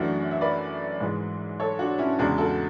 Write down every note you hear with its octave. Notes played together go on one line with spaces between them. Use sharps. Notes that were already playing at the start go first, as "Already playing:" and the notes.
Already playing: F#2 E3 A3 D4 F#4
E5
B4 D5
G#2 E3 G#3
A4 C#5
D4 F#4
C#4 E4
E2 C#3 G#3 D4 F#4
F#4 A4